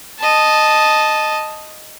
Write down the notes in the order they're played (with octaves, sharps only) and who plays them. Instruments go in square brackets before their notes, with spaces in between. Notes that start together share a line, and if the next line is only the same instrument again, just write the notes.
[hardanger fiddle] D#5 A5